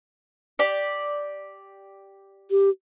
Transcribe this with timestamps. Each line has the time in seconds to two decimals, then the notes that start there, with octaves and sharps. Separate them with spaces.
0.59 G4 D5
2.51 G4